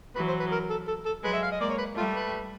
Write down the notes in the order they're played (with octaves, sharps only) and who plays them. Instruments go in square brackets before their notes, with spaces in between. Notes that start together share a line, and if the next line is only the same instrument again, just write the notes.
[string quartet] E3 F#3 [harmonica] B4
[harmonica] C5
B4
A#4
A4
A4
A4
[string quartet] F#3 G#3 [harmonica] B4
[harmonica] E5
F5
D#5
[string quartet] G#3 A#3 [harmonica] D5
[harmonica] C#5
B4
[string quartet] G3 A3 [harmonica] F4
[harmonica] B4